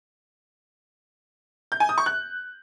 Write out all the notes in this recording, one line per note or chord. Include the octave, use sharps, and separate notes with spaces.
G6
G#5
D#6
C#6
F#6